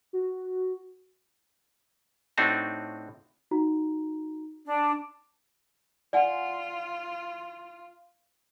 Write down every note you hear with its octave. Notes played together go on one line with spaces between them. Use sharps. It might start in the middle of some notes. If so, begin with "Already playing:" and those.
F#4
A2 A3 C4 D4 D#4 F#4
D#4 F#4 A#5
D4
F4 D5 F#5 G#5